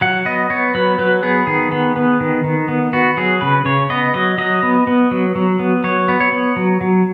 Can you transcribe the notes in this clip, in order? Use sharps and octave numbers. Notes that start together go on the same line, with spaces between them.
F#3 F#5
B3 D#5
B3 C#5
F#3 B4
F#3 B4
B3 G#4
D#3 G#4
B3
B3
D#3
D#3
B3
B3 F#4
F#3 G#4
C#3 B4
C#3 C#5
B3 D#5
F#3 D#5
F#3 D#5
B3
B3
F#3
F#3
B3
F#3 C#5
B3
C#5
B3
F#3
F#3